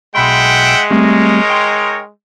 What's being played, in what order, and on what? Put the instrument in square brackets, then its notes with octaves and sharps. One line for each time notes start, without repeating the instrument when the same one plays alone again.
[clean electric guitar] B1 B5 C6 [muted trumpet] G#3 [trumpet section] E5 F#5 G5
[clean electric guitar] G3 A3 C4 [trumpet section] D#4 A#4 C#5
[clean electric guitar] G5 C6